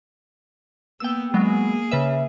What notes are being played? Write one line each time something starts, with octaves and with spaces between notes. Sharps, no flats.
A#3 B3 G5 E6
F#3 G#3 A#3 B3 G#4
C#3 B4 E5